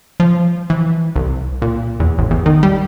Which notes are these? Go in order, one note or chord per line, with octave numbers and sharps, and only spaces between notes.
F3
E3
C2
A#2
E2
A1
E2
D#3
G3